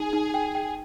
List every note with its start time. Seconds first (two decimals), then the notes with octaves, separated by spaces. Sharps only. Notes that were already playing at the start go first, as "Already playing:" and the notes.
Already playing: D#4 G#4
0.13 D#4
0.34 G5
0.55 G5